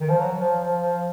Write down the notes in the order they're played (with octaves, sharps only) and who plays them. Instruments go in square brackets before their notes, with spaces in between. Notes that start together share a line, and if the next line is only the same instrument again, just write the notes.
[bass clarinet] D#3
F3
F#3
F3
F3
F3